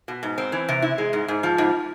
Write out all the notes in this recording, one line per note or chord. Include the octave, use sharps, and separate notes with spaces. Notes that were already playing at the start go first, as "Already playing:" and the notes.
B2
G#2
C4
E3
C3
E4
G#3
G#2
G#2
F3
G#2